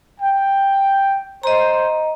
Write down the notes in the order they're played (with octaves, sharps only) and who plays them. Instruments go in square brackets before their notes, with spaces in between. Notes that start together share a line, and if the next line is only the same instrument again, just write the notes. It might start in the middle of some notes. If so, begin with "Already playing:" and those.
[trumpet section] G5
[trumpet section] C5 [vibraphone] D#5 A#5